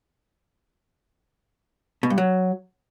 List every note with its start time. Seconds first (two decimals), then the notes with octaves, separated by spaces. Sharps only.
2.03 B2
2.10 G2
2.18 F#3